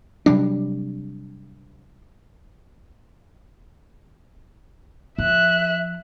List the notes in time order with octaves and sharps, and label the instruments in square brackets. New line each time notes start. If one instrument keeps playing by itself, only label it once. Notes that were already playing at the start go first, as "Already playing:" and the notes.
[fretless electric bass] C3 F#3 G3 D4
[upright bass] F3 [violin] E5 F#6